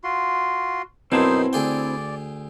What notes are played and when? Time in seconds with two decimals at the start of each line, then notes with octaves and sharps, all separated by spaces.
0.04 F4 F#4 C6
1.12 F#2 B2 C4 D#4 E4 C5 A5 C6
1.53 D2 G#4 D5 G5